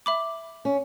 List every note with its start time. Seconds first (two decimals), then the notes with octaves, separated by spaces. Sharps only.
0.06 E5 B5 D6
0.65 C#4